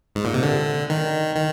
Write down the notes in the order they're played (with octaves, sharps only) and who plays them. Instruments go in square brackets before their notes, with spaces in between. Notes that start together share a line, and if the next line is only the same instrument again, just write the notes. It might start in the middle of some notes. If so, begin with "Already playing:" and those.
[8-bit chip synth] G#2
A#2
C3
D3
D#3
D#3